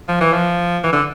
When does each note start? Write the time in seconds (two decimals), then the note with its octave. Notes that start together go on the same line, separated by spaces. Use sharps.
0.08 F3
0.21 E3
0.33 F3
0.84 E3
0.93 D3